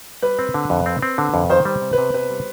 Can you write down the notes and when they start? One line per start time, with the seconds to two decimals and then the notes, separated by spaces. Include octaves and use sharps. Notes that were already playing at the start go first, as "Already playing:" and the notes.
0.22 G3 B4
0.39 C4
0.54 D3
0.70 F2
0.86 C4
1.02 C4
1.18 D3
1.34 F2
1.50 D#3 C5
1.65 G3
1.81 C3
1.93 B4
1.98 C3
2.14 C3 B4
2.30 G3